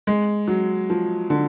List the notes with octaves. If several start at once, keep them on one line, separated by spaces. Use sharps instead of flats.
G#3
F#3
F3
D3